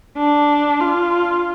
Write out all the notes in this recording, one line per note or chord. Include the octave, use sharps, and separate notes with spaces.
D4
F4